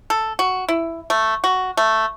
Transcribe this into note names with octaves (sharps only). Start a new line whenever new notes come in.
A4
F#4
E4
A3
F#4
A3